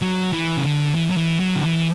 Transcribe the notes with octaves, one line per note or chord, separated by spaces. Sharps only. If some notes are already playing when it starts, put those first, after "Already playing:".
F#3
E3
C#3
D3
E3
F#3
E3
F#3
D3
E3